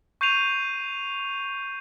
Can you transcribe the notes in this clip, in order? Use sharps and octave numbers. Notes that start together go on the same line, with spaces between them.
C#6 G6 C7 D#7 F7